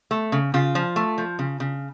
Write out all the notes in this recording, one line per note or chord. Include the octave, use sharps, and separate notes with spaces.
A3
C#3
C#3 F4
F3
A3
F3
C#3
C#3